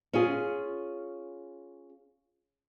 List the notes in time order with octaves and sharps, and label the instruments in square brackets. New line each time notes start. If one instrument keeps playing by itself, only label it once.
[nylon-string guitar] C#4 F4 G#4